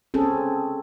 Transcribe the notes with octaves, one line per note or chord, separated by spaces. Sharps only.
C4 C#4 G#4 A4